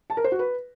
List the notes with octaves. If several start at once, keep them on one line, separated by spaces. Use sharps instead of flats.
A5
A#4
C5
F#4
B4